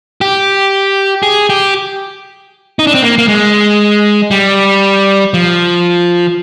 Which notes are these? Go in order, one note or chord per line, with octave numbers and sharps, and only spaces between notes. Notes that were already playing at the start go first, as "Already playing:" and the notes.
G4
G#4
G4
D#4
D4
C4
A#3
A#3
G#3
G3
F3